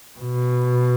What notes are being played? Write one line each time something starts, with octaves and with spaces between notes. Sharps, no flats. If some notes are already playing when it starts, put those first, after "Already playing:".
B2